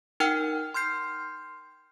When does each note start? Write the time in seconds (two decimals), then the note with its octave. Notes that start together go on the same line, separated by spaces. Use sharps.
0.20 D#4 A#4 F#5 G5 F6
0.74 C6 F6 G6 C7